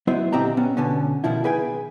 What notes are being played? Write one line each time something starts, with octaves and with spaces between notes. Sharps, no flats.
F#3 B3 E4 C5 D#5 E5
A#2 D3 C4 G4 D#5 A#5
B3 C#4
B2 D3 B3 C#4
B2 D#3 F3 E4
G#4 B4 G5 G#5